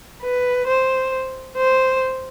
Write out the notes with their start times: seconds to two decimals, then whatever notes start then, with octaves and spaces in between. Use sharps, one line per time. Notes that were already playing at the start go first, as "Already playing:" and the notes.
0.22 B4
0.67 C5
1.58 C5